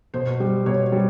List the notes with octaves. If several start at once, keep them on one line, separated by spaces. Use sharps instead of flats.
B2 C5
G3
B2 C#5
G3